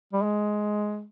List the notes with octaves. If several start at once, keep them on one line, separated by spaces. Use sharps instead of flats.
G3
G#3